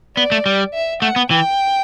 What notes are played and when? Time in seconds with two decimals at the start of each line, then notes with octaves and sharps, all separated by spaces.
0.17 B3 D5
0.32 A3
0.46 G3
0.74 E5
1.02 A3 F#5
1.16 B3
1.30 E3 G5